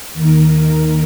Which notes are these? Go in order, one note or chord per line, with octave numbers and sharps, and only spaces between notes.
D#2 D#3 A#4